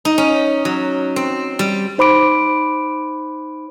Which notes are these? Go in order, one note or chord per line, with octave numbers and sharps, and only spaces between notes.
D#4
C#4
F#3
C4
G3
D#4 C5 B5 D6 D7